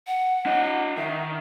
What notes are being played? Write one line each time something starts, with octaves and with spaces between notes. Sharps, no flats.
F#5
D4 D#5
D#3 E5